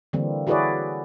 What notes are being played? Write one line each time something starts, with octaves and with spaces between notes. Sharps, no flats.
D3 E3 G3 A#3 C4
E4 F#4 G#4 B4 C#5 D5